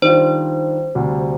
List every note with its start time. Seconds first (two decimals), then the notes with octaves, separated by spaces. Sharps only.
0.02 D#3 G3 D4 F4 C5
0.95 D2 C3 G3